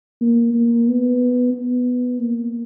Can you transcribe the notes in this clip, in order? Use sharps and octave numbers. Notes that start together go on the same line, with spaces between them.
A#3
A#3
B3
B3
A#3